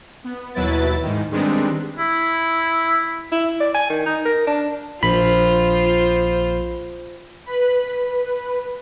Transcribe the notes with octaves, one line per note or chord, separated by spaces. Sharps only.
B3
D#2 B2 F#3 E4 B4 A6
G#2 D#3
D#3 G3 G#3 B3 C4 D4
E4
E4
D5
G#5
D#3
D#4
A#4
D4
A#1 F4 C5 B5
B4 B5